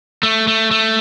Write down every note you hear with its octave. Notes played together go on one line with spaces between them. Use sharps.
A3
A3
A3